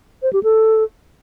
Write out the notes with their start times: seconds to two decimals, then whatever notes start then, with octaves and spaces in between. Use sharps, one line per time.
0.23 C5
0.33 G4
0.43 A4